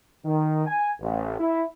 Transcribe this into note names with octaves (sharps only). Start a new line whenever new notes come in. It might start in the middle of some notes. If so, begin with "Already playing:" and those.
D#3
G#5
A1
E4